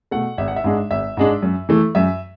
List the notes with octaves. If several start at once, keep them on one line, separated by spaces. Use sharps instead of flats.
B2 A3 F#5
G#1 E5
F#5
E5
G#2 G#3 D4
G#1 E5
G#2 G#3 D4
F#2
E3 A3
F#2 E5